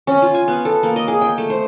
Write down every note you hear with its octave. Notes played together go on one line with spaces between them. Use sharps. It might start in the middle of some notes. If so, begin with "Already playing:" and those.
C#4
F4
G#5
B3
A4
A#3
D#5
G#4
G5
A3
C5